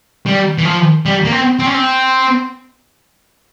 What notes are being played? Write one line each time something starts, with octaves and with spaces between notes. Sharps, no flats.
G3
E3
F3
G3
A#3
C4
C4
C#4
C4